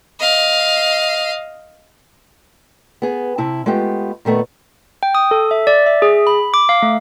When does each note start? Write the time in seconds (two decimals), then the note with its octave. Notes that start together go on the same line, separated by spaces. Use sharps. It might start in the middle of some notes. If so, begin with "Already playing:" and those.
0.19 D#5 F5
3.02 B3 G#4
3.38 C3 E4 A5
3.66 G#3 A3 B3 F4 G4
4.25 A#2 D#3 A3 B3
5.03 G5
5.15 D#6
5.31 A4
5.51 E5
5.67 D5
5.86 E5
6.02 G#4
6.27 B5
6.54 D6
6.69 F5
6.82 A3